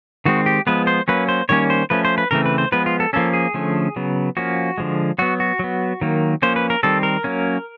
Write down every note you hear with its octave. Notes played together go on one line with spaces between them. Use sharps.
D#3 G#3 C4 F#4
G4
F3 G#3 B3 B4
C5
F#3 A#3 C#4 B4
C5
D#3 G3 A#3 C#4 C#5
C5
F3 A3 C#4 B4
C5
B4
C#3 E3 A3 C4 A#4
B4
C5
F3 G#3 B3 B4
F4
A4
F3 A#3 C#4 A4
G#4
D3 F3 A3 C#4
C#3 F#3 B3
F3 A#3 C#4 F#4
D3 F3 G#3
F#3 B3 F#4
F#4
F#3 B3
D#3 F#3 A#3
F3 A#3 C#4 C5
B4
A#4
D#3 G3 C4 A4
A#4
F#3 A#3 C#4